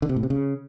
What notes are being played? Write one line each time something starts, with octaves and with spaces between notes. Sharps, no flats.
D3
C3
A2
C3
C#3